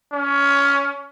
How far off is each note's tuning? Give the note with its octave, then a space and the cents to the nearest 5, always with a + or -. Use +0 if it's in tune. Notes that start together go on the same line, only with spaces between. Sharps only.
C#4 +20